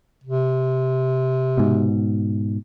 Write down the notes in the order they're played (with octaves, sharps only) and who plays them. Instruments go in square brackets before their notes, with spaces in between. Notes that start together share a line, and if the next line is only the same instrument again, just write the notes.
[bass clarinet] C3
[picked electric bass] G#2 B2